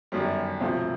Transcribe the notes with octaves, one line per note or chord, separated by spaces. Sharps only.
G1 F#2 D#3 G3
E1 D2 C3 F3